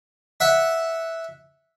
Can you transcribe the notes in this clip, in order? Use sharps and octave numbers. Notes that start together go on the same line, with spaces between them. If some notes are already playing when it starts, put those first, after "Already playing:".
E5 F#5